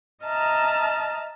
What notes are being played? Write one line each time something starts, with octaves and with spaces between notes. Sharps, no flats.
D#5 E5 A5 A#5 F6